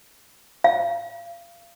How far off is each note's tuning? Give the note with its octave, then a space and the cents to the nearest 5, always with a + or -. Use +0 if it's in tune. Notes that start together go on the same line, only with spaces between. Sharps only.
F5 -30